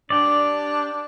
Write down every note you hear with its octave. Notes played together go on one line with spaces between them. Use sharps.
D4 G4 D5